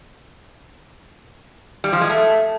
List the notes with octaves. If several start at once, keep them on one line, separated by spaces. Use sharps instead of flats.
G3
F3
G#3
A3